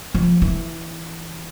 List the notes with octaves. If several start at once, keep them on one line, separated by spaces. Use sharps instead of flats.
F3
E3